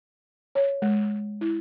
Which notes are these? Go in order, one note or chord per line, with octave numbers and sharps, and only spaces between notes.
C#5
G#3
E4